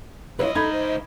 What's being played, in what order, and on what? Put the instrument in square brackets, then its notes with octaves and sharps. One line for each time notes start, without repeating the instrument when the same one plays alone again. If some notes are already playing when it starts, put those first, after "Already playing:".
[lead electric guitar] C#2 D#5 [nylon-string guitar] E4 F4 B4 [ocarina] C#5
[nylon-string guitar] D#4 [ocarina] A4 [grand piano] B5 G#6
[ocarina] C5